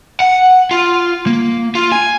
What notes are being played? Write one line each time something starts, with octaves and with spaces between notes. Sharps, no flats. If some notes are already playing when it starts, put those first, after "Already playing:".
F#5
F4
A#3
F4
G#5